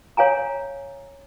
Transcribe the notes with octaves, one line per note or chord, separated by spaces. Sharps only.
C#5 F5 G#5 A#5